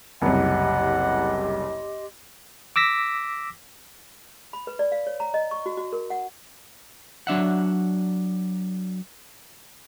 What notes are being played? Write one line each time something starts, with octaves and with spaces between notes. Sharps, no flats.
F#1 C2 G4 D#5 F#5 C6
D6 E6 A#6 B6
B5
B4
D5
F5
C#5
A#5
D#5
C#6
F#4
F#4
A#4
F#5
F#3 D4 E5 F#5